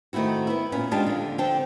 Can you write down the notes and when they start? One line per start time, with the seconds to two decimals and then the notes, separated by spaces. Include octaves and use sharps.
0.13 D#3 A3 C4 E4 F#4
0.47 B3 E4
0.72 A#2 B3 C#4
0.91 G#3 D4 F4 G4 A5
1.06 D3 F3
1.38 D3 C4 G5 A5